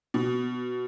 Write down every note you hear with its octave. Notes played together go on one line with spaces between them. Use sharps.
B2